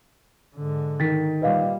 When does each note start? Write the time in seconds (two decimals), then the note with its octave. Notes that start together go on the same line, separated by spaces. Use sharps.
0.56 G#2 D3
1.00 D#3 A6 B6
1.42 A#2 G3 B4 D#5 F5